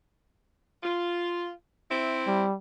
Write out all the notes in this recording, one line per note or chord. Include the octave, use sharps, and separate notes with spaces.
F4
C4 E4
G3